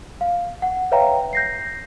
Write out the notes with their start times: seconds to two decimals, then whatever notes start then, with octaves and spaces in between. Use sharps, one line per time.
0.21 F5
0.62 F#5
0.92 B4 C#5 E5 F5 G5 A#5
1.33 G6 A#6 C7